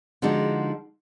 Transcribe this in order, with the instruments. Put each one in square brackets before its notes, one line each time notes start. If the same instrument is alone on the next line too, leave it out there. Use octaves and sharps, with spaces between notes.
[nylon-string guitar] D3 F3 G#3 D4 D#4 F#4